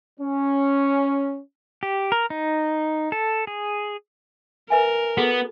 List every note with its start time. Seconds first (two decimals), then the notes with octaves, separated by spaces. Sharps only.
0.20 C#4
1.83 G4
2.12 A#4
2.30 D#4
3.12 A4
3.47 G#4
4.70 A#4 B4 E5 G#5
5.18 B3 F#4 G#4 A4